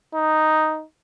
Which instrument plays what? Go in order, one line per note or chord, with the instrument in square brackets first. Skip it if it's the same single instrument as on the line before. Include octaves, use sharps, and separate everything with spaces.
[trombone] D#4